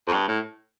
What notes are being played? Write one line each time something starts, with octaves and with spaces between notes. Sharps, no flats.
F2
G2
A2